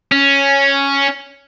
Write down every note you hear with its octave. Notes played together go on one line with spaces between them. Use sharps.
C#4